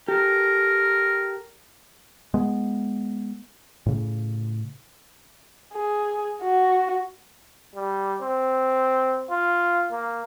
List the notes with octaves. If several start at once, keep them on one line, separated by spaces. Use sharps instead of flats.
G4 A4 A#4
G#3 B3
A2 C#3
G#4
F#4
G3
C4
F4
A#3